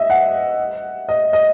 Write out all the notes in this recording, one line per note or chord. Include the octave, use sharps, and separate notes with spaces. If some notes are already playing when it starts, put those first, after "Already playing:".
Already playing: D#5 E5
F#5
D#5
D#5